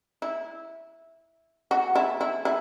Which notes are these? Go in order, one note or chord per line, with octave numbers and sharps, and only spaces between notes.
E4
F#4
E4
E4
E4